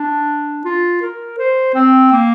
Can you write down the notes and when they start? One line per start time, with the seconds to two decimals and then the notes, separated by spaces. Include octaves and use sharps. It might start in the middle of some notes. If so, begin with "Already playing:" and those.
Already playing: D4
0.65 F4
1.02 A#4
1.38 C5
1.74 C4
2.12 A#3